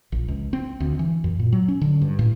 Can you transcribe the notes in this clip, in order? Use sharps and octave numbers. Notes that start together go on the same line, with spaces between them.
A#1
C#2
C4
D2
E3
F#2
A#2
F#3
C#4
D3
G2
A2